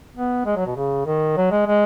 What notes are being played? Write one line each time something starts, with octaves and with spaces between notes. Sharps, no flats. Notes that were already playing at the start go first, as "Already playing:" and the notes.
B3
G#3
F#3
B2
C#3
D#3
F#3
G#3
G#3